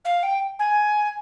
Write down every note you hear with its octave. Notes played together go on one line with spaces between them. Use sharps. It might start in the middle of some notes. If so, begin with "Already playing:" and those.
F5
G5
G#5